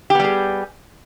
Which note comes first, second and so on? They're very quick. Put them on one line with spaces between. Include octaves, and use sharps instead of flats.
G4 B3 G3 G#4